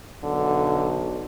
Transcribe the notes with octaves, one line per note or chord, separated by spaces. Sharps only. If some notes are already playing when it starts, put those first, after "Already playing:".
B1 D3